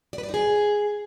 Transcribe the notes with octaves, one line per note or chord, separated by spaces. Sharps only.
D5
B4
D5
D#4
G#4